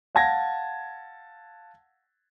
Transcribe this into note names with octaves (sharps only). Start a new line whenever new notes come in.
F5 F#5 A5 G#6 A#6